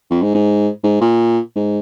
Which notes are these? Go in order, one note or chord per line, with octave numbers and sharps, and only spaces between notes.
F2
G#2
G#2
G#2
A#2
G#2